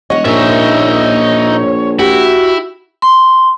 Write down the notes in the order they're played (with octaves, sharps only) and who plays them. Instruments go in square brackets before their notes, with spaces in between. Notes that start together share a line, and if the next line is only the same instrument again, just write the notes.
[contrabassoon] E1 [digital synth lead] C#5 [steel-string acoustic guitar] D#5 F#5
[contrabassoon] A#1 [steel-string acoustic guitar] A#2 [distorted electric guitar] D#4 E5
[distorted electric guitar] E4 [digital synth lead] F#4 [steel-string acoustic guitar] G4
[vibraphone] C6